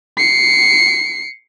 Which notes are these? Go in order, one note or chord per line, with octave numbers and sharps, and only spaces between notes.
C7 C#7